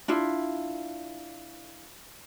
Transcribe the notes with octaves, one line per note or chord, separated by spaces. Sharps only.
D4 E4 F4